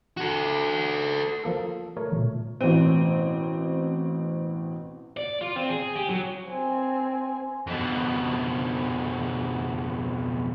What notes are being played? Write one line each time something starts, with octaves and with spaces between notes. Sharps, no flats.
F#4 A4
F3 A#3 A4
A3 A#4 C#5
A#2
A1 B2 C4 D#7
D5
F4
C4
G#4
G4
F#3
C4 G#5
F2 B2